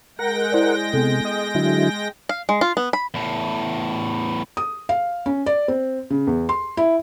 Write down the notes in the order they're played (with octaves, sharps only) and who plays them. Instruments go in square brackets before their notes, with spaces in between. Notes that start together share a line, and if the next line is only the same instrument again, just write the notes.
[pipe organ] G#3 G5 A#6 [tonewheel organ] A#4 F#5
[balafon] E4 C5 D5
[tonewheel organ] C3 [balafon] B3 A4
[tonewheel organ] D#5
D3 F#3 E4
[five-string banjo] F5
G#3
F4
B3
B5
[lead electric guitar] E2 A2
[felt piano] D#6
F5
C#4
D5
C4
C#3
E2
C6
E4